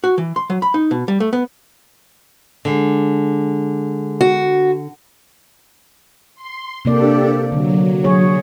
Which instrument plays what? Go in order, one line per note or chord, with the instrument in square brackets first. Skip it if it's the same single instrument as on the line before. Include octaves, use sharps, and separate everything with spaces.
[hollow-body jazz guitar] F#4
E3
C6
F#3
B5
D#4
B2
G3
A3
B3
[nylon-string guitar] D3 [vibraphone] G#3 D4 G#4
[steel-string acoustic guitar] F#4
[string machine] C6
[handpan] C3 A#3 D5 [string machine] D4 G4 A4
[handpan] D3 [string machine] F#3
[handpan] G#4 C#5